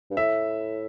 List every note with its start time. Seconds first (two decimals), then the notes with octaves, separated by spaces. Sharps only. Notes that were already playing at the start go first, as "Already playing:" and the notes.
0.11 G2
0.17 A2 E5